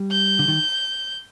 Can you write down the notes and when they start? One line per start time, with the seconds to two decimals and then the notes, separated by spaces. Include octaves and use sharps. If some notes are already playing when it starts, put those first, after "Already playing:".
Already playing: G3
0.11 G6
0.39 D3
0.48 D#3